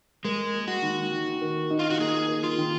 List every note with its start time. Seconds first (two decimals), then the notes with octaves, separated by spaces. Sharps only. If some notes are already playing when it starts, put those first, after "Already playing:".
0.25 G#3 A#4
0.54 A#3
0.68 F#4
0.82 D#3
1.11 D#3
1.42 A#4
1.71 D#4
1.79 F4
1.90 F#4
1.99 A#3 G#4
2.28 A#4
2.44 F4
2.58 D#3